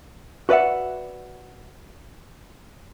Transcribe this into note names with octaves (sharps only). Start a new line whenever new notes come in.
F#4 B4 D5 E5 F#5